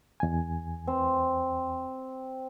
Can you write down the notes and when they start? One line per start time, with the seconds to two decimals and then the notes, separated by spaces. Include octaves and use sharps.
0.20 E2 G#5
0.87 C4